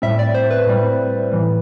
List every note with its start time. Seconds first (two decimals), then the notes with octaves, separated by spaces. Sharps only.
0.02 A2 G3 C4 E5
0.19 D5
0.34 C5
0.50 B4
0.67 A2 G3 C4
1.32 A2 E3 G3